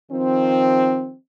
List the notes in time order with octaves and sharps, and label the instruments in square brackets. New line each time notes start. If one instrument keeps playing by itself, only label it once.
[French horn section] D#3 F3 C4